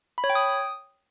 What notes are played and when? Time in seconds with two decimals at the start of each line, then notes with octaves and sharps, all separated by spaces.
0.18 B5
0.24 C#5
0.30 G5
0.35 D#6